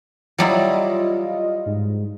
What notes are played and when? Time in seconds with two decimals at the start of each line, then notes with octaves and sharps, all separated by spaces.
0.38 F#3 G3 E4 F4 D#5
1.66 G#2